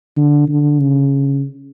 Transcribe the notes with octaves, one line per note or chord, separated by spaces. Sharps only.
D3
D3
C#3